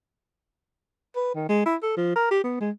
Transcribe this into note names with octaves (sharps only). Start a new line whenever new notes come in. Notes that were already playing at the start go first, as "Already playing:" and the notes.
B4
D#3
G#3
E4
A4
F3
A#4
G4
B3
G#3